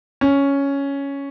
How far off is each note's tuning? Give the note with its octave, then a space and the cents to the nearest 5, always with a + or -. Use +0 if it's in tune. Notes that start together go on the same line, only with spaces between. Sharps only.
C#4 +5